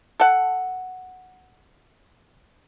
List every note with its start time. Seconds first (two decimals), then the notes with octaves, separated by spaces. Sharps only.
0.20 A4 F#5